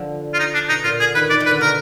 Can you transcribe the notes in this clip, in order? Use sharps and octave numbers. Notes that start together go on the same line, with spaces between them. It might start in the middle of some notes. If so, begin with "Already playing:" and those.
Already playing: D3 F3
F4
D#4
D4
B2 D#4
A#2 F4
D3 G#4
D#3 B4
D#3 D5
D#3
B4
D3
B2 A#4